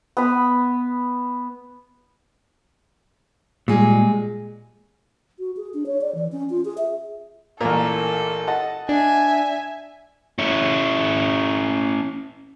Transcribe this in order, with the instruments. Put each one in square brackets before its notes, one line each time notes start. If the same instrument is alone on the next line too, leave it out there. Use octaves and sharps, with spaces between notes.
[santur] B3 B5
[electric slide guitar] A#2 [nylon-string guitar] G3 G#3 G#4
[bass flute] F#4
G#4
D4
C#5
D5
E3
C#4
F4
G#4
E5
[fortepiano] A1 A#2 [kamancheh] A4 [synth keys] A#4
[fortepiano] D#5 F#5 A5
[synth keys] D4 [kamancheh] E5 G#5
[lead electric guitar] C#4 E4